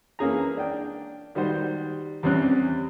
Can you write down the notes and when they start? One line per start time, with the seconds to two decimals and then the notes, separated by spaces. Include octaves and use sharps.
0.19 E3 A#3 C#4 G#4 A#5
0.57 D4 G5
1.35 D#3 G3 F#4 C5
2.23 E2 G3 C4 C#4 F#6